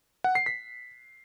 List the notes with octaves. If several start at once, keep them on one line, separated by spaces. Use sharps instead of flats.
F#5
C7
B6